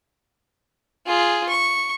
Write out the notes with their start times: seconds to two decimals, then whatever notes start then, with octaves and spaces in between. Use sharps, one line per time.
1.07 F4 G#4
1.49 C#6